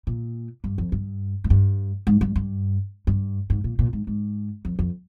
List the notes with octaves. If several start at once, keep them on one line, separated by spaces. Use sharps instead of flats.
A#2
G2
F2
G2
G#2
G2
G#2
G2
G2
G2
G#2
A#2
A#2
G#2
G#2
F2
F2